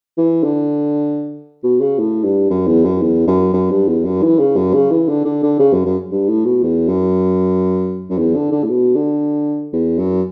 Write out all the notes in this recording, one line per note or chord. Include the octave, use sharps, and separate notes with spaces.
E3
D3
B2
C#3
A2
G2
F#2
E2
F#2
E2
F#2
F#2
G2
E2
F#2
E3
C#3
F#2
C#3
E3
D3
D3
D3
C#3
F#2
F#2
G2
A2
B2
E2
F#2
F#2
E2
D3
D3
A2
B2
D3
E2
F#2